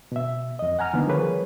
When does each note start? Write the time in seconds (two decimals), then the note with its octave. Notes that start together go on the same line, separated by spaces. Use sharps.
0.12 B2 E5
0.59 F2 D#5
0.79 F#5 G#5 A#5 F6
0.93 D3 D#3 A#3 B3
1.07 F3 G3 A#3 G#4 B4 C#5